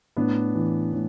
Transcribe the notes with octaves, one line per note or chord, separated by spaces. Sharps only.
A2 B3 D4
E3
A2